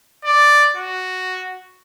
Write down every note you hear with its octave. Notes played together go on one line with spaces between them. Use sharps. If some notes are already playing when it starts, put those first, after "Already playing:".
D5
F#4